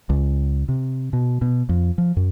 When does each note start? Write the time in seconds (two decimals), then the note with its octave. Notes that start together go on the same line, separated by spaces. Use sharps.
0.09 C#2
0.68 C3
1.13 B2
1.42 B2
1.69 F2
1.98 F3
2.17 F#2